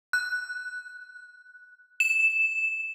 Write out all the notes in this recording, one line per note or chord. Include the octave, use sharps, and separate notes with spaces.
F#6
E7